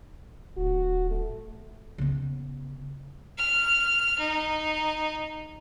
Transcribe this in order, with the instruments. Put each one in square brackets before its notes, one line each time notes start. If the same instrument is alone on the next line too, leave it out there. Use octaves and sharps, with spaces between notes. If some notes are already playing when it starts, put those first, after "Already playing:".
[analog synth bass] D1 [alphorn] F#4
[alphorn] A3
[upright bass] C#3 B3
[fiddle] F6
D#4